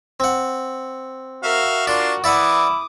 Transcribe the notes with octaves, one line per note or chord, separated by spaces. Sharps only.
C4 F#5
F#4 A#4 E5 F5
D4 F4 A#4 D5
E3 E4 D5 E5 F#5 D6 D#6